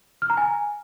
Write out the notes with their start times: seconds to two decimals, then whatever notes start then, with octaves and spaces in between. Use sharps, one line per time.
0.22 F6
0.30 A#5
0.37 G#5